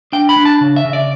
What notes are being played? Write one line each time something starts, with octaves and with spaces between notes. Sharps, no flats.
D4 G5
B5
D4
A5
C#3
E5
C#3
D5